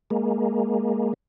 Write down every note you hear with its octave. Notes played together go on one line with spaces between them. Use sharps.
G#3 A#3